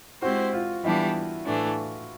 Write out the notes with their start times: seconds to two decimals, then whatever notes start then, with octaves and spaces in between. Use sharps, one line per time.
0.22 G#3 C4 E4 F#4 G4 C5
0.53 F4
0.84 E3 G3 B3 D4 E4 G4
1.46 A2 E3 A3 D4